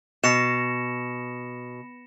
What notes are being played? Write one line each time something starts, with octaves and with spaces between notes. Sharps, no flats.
B2 A#6 C#7 E7